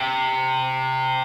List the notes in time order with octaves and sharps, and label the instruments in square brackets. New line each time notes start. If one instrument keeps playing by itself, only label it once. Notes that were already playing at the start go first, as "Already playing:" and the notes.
Already playing: [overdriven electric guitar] C3